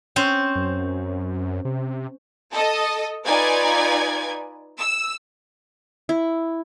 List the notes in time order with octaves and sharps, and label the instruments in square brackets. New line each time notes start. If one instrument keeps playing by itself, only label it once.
[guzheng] C4 C#4 C5
[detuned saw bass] F#2
C3
[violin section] A4 D#5
D#4 F4 B4 D5 G#5 G#6
E6
[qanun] E4